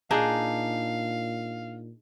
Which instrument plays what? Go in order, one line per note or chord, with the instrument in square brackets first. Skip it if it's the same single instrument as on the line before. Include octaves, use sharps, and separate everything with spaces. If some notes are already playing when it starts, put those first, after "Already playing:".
[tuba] A#2 [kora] D4 D#4 G#4 [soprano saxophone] F5